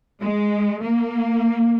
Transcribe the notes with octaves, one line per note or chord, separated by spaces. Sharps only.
G#3
A#3